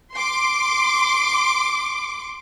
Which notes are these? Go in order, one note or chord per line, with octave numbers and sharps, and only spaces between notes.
C6 D6